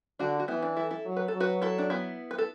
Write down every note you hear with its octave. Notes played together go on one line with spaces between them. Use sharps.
D3 D4 F#4
F#4
E3 B3 E4
D4
E4 A4
E4 A4
F#3
B4
A4
F#3
F#4 B4
E4 A4
D4
B3 E4
B4
A4